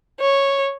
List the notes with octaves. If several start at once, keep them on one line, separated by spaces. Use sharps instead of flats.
C#5